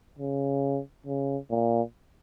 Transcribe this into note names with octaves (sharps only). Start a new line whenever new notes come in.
C#3
C#3
A#2